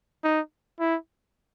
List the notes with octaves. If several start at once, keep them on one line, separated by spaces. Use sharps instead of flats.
D#4
E4